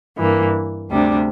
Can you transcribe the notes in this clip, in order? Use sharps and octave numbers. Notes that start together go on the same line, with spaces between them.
G2 E3 A#3
D2 C3 G3 D4